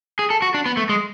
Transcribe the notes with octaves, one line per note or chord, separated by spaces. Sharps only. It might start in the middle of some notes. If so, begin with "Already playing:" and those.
G#4
A4
F#4
D4
B3
A3
G#3